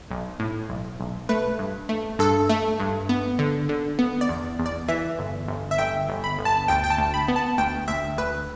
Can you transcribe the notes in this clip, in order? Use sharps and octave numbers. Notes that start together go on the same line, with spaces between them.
B1
A2
B1
B1
A3 B4
G2
A3
G2 A4
A3
G2
B3
D3
D3
B3
D5
E2
E2
D5
E3 E5
G1
G1
E5
G1 G5
G1
B5
G1
A5
D2 G5
G5
A5
D2
B5
B3
A5
D2 G5
D2 E5
D2 B4